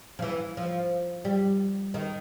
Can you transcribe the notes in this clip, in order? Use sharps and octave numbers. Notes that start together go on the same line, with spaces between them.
F3
E3
F3
G3
D#3